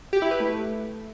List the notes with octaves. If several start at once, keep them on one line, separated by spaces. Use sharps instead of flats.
G4
E4
B4
A3